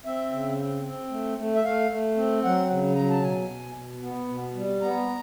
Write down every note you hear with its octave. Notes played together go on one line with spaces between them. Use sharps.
C4 E5
C#3
C4
C4
A3
A3
E5
A3 F5
A3
C4
F#3 F#5
C#3
F#3 A#5
A5
B2 G#5
B2
B2
B3
B2
G3
B3 A#5